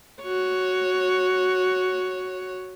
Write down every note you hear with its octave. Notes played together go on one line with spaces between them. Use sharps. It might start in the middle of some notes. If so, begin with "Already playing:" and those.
F#4 C#5